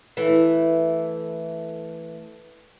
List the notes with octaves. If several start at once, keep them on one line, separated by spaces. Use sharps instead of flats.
E3 A3